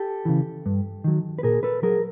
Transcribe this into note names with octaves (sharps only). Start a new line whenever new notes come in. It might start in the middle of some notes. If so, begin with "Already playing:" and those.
Already playing: G4 A4
C#3 E3
G2
D#3 F#3
B4
A#2 G#4 A#4
A4 B4
F#3 G#4 A#4